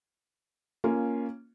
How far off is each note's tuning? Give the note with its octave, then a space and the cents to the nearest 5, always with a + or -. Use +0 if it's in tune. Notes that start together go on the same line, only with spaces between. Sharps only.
A#3 +0 C#4 +0 F4 -15